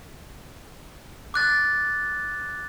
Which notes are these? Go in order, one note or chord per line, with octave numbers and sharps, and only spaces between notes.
D6 F#6 A6